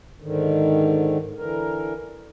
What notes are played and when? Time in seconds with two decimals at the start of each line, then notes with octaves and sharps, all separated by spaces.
0.22 G#2 D3 D#3
1.38 D3 E3 A#4